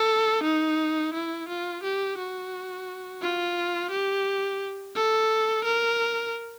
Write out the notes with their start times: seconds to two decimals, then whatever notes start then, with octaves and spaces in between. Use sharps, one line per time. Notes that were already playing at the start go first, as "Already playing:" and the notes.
Already playing: A4
0.44 D#4
1.14 E4
1.49 F4
1.84 G4
2.18 F#4
3.22 F4
3.91 G4
4.95 A4
5.64 A#4